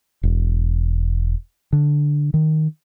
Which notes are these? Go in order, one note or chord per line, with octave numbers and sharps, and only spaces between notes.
E1
D3
D#3